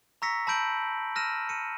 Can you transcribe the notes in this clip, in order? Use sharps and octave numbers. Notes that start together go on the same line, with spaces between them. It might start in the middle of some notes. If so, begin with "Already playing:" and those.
A#5 C#6 E6 A#6 B6 C#7
A5 B5 E6 G6 D7 F#7
E6 F6 A#6 D#7 E7
C#7 D#7